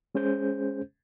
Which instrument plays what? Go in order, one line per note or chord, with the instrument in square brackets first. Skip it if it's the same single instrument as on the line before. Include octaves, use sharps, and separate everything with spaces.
[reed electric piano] G#3 C#4 G#4 C5 G6